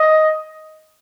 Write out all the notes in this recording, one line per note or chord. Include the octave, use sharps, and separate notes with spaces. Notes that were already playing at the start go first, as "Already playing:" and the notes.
Already playing: D#5